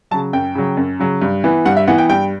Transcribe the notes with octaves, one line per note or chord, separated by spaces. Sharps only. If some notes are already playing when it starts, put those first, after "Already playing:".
C#3 F#3 A5
F#2 G5
C#3 F#3
F#2
C#3 F#3
G2
E3 B3
G2 F#5
E5
E3 B3 F#5
G5
G2 G5